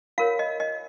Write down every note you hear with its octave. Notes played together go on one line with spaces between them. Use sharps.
F4 A#4 C#5 F5
D#5
D#5